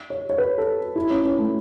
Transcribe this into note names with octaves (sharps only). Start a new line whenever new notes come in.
C#5
C#5
B4
A4
E4
C#4
C#4
A3